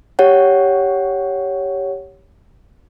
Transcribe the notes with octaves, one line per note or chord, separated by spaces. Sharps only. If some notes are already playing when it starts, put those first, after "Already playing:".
G4 C#5 F#5